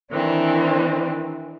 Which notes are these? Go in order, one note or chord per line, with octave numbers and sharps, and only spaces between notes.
D#3 E3 C4 D4